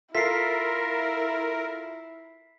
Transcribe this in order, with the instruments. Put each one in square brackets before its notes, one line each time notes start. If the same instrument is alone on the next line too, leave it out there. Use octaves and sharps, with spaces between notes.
[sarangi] E4 [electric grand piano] F4 A4 E5 [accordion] A#4 [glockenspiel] B6 C7